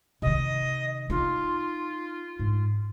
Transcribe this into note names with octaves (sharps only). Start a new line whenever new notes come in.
C3 D#3 D#5
D#4 F4
G#2